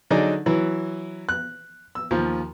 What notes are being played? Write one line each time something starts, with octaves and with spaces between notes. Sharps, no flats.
D3 F#3 D4 D#4 G#4 D5
E3 F#3 E4
F#6
E6
D#2 F3